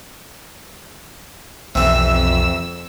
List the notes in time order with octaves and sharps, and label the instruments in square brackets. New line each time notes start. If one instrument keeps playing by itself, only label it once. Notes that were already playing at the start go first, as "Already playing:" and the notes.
[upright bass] B1 [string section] F2 E6 [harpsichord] C3 E3